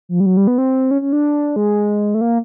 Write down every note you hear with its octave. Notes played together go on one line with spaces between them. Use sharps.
F3
G3
F#3
G3
B3
C4
C#4
C#4
D4
G#3
A3
A#3